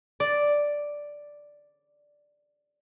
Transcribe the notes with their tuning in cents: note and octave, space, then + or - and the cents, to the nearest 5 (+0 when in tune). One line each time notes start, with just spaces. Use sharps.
D5 +0